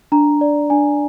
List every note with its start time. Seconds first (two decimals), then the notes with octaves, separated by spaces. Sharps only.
0.12 D4 A#5
0.41 D5
0.70 D4 G#5